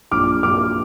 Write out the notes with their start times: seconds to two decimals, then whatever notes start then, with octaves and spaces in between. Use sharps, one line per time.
0.11 A#1 D6 F6
0.43 A#1 D6 F6